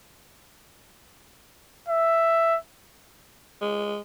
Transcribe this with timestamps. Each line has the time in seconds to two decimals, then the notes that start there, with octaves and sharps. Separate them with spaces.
1.89 E5
3.62 G#3